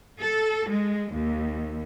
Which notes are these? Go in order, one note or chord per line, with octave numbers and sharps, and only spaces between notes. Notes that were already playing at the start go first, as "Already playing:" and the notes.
A4
G#3
D#2